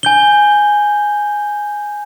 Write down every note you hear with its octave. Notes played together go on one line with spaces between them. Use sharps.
G#5 G6 G7